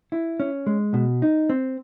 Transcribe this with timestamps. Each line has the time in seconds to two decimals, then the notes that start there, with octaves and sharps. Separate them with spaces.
0.12 E4
0.40 C#4
0.66 G#3
0.94 B2
1.22 D#4
1.49 C4